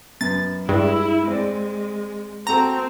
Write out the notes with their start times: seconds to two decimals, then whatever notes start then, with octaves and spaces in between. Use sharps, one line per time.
0.21 F#2 B3 A6
0.69 G2 G#3 E4
1.27 G#3 C4 D5
2.47 C4 F#4 A4 A#5